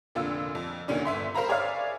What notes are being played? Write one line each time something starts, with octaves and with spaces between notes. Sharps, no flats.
F1 A#2 D3 F4 E6
F2
D2 A#2 D#3 C#4 D4
G1 E5 C6
A#4 C5 F5 A#5 B5
G#4 C#5 D5 E5 F5 F6